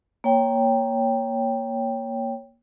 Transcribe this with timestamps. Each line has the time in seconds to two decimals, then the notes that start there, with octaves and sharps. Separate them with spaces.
0.24 A#3 C#5 G5